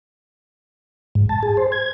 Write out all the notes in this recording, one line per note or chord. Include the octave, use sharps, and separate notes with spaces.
G#2
A5
G#4
C5
G#6